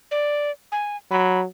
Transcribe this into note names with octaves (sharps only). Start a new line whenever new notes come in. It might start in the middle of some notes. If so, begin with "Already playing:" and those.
D5
G#5
F#3 B5